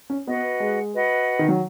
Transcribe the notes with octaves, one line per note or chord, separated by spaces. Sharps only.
C#4
B3 F#4 B4 D#5 F#5
G#3
F#4 B4 D#5 F#5
D#3
F#3